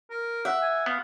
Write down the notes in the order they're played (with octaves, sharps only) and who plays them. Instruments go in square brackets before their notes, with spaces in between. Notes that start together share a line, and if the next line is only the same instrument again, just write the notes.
[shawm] A#4
[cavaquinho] E5 [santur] F#5
[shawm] G#5
[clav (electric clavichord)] B3 [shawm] F5